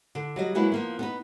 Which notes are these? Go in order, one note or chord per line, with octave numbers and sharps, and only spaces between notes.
D3
F#3 G3 D#5
F#3 G#3 A#3 E4 F#4 B4
F3 A#3 B3
B3 D#4 B4